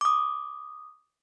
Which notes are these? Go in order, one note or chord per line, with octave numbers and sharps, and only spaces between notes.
D6 D#6